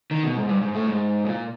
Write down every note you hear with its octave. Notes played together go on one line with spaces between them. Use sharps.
D#3
B2
G#2
G2
G#2
A2
G#2
A#2